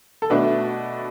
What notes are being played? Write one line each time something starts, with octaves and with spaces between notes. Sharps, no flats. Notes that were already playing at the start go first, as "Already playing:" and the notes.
A4
B2 A3 D4 B4